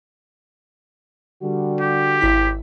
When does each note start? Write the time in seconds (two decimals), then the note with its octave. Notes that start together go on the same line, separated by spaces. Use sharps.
1.43 D3 G3 F#4
1.81 G4
2.21 G#1 E4 B6